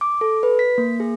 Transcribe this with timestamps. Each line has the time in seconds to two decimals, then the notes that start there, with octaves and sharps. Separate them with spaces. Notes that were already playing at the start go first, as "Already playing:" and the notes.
0.01 D6
0.21 A4
0.43 B4
0.59 B6
0.78 A#3
1.00 G#4